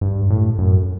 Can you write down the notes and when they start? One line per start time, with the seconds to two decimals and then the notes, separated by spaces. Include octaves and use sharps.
0.01 G2
0.30 A2
0.59 F#2